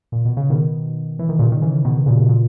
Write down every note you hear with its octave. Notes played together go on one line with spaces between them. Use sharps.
A#2
B2
C#3
B2 D#3
E3
D#3
A#2 C#3
D#3
C#3 E3
B2 D#3
A#2 C#3
A#2